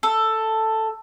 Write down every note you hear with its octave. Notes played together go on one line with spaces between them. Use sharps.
A4